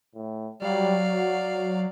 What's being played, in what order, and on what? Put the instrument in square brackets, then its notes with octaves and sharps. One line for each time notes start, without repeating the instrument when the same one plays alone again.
[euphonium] A2
[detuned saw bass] F#3 [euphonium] G3 [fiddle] D5 F5
[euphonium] F#4